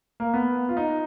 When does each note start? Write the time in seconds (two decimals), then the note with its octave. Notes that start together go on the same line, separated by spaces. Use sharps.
0.20 A#3
0.34 B3
0.69 F4
0.77 D#4